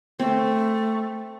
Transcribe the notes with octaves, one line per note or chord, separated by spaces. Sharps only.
A3 C4